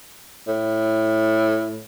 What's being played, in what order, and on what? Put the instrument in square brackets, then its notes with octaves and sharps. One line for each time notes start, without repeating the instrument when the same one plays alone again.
[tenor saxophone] A2